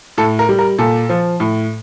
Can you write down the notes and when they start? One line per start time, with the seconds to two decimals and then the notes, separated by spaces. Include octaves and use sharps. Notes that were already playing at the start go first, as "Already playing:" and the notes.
0.18 A2 A4
0.39 A#4
0.49 G3
0.59 A#4
0.78 A#2 A4
1.09 F3
1.40 A2